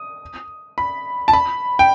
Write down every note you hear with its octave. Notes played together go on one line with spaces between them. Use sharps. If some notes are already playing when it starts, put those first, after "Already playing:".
Already playing: D#6
B5
A5
B5
G5